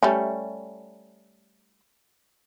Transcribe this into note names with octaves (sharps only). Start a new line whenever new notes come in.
G3 A3 C#4